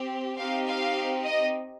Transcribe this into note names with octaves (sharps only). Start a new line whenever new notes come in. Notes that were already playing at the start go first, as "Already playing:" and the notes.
Already playing: C4 G4
C4 D#4 G4 F5
F5
D#5